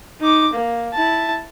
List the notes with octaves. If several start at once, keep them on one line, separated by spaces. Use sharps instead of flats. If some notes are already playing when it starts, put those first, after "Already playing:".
D#4 D6
A#3
E4 A5